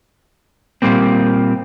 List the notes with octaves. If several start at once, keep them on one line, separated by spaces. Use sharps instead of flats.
A#2 G3 A#3 C4